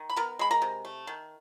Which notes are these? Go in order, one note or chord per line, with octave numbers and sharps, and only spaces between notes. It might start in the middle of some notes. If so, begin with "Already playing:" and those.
Already playing: D#3
B5
B3 A#4 A#5
G#3 B5
A#4 A#5
C3
A3
D#3